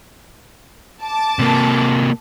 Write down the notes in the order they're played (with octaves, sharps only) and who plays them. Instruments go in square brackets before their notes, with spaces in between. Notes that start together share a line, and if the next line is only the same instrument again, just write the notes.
[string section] A5 D6
[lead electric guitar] C3 A#3